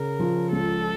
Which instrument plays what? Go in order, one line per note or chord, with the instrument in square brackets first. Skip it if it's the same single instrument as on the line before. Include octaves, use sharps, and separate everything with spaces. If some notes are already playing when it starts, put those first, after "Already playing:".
Already playing: [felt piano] C#3 [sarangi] A#4
[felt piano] F3
[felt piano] C#2 [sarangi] A4